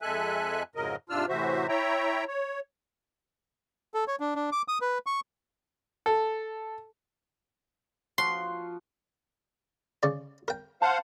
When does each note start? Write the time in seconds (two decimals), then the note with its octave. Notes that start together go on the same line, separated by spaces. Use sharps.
0.02 F2 G#3 A4 E5 G#5 F#6
0.75 F2 G#2 C#3 F#3 A#4 D#5
1.10 G#2 C3 D4 F4 E6 F6
1.29 A2 C3 E3 F#4 C5 E5
1.69 E4 C#5 E5 G5 A#5
2.28 C#5
3.94 A4
4.08 C#5
4.20 D4
4.35 D4
4.52 D6
4.68 D#6
4.81 B4
5.06 C#6
6.06 A4
8.18 F3 F4 F#4 C6
10.03 C#3 D5
10.48 A#4 G5
10.82 C5 F5 F#5 A5